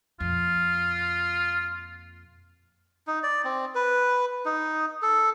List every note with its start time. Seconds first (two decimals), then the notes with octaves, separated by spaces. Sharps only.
0.20 F2 A#2 F4
3.07 D#4
3.23 D5
3.44 C4
3.75 B4
4.45 D#4
5.02 A4